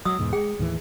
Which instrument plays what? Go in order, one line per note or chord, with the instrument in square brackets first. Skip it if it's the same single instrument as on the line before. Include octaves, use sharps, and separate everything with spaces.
[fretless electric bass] F#3 [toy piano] D#6 E6
[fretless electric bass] E2 G#2 B2
[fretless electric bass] G#3 [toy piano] G#4 G5
[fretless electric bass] D#2 A2 E3